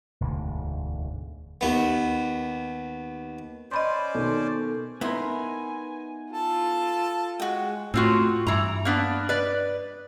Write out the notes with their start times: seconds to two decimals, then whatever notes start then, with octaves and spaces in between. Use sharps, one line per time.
0.21 E1 D2 G#2 D3
1.61 D#2 B3
3.71 C#4 C5 D5 D#5 B5 C6
4.15 B2 D#3 A4
5.01 B3 D#4 E4 A#4 G#5 C6
6.33 F4 A4 A5
7.40 G#3 F#4 G5
7.94 A2 C4 F4 F#4
8.47 G2 E3 A#5
8.85 A#3 B3 D4
9.29 B4 D5